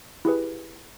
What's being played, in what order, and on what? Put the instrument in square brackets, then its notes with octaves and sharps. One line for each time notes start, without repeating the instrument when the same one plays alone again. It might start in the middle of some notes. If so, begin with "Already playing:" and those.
[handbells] E4 G4 G#4 B4